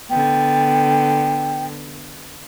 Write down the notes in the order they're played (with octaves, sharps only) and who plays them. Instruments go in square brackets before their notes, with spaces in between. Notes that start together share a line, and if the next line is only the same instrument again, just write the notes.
[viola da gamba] D3 B3 [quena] G5